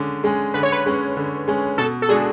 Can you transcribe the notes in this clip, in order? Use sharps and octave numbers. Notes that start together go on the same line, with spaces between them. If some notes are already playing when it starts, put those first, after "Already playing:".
Already playing: D3 G#3 C#4 G#4
G#3 C#4 G#4
D3 B4
C#5
B4
G#3 C#4 G#4
D3
G#3 C#4 G#4
B2 A4
A4
G#3 D4 F#4 G#4